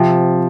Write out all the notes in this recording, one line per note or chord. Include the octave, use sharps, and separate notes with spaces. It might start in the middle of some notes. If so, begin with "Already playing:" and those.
Already playing: C3 F3